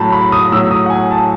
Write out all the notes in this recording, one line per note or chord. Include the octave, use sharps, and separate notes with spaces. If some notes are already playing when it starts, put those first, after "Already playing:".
Already playing: A2 F#3 A5 B5
B5
D#6
A2 F#3 E6
D#6
F#5
G#5
A5